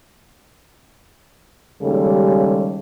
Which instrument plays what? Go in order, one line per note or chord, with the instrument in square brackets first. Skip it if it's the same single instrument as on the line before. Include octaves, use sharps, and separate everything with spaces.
[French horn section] D#2 C#3 G3 G#3 A4